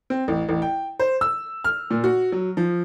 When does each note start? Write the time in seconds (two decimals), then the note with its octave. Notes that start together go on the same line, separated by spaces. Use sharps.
0.10 C4
0.28 A1
0.49 A1
0.62 G5
0.99 C5
1.21 E6
1.64 F6
1.91 A#2
2.04 F#4
2.32 F#3
2.57 F3